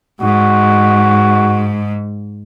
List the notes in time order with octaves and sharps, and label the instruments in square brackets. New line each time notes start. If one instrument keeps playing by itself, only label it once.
[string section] G#2 [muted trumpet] F#4